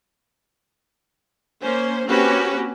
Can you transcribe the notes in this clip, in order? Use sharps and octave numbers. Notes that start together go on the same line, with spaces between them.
A#3 C#4 C5
A#3 C4 C#4 F#4 G4 B4